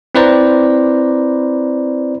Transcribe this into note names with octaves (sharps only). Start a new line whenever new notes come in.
C4 E4 B4 C5 D5 A#5